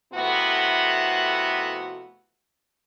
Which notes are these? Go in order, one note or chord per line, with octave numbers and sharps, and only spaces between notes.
F2 C3 A3 B3 E4 F#4